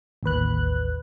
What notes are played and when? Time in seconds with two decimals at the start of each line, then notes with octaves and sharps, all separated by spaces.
0.23 A1 D#2 B4 F#6